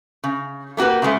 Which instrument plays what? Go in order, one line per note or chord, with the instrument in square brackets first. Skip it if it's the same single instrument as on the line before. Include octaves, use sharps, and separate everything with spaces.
[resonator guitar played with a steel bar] C#3
A3 A#3 F#4 G4 B4
C#3 F3 G#3 A3